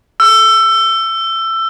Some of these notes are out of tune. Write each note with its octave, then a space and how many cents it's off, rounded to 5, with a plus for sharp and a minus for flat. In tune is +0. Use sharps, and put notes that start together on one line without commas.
E6 +20